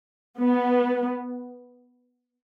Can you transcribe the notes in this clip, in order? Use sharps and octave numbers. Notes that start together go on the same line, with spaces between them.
B3